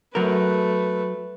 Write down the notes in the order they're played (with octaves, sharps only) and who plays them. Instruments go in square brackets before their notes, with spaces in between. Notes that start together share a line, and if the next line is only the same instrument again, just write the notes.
[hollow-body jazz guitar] F#3 A#4 [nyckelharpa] A3 B4